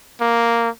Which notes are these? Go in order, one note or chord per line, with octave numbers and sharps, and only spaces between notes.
A#3